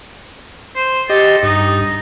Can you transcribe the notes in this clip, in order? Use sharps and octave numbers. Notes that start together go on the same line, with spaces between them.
C5
G4 A4 D#5
G2 D#4